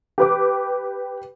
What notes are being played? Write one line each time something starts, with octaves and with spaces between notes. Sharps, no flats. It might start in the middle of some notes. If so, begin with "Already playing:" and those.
G4 B4 D6